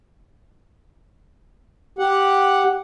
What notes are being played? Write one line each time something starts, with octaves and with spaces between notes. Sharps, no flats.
G4 F#5